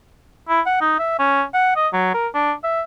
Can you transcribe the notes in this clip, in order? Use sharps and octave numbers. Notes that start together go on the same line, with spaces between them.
E4
F#5
D#4
E5
C#4
F#5
D#5
F#3
A#4
D4
E5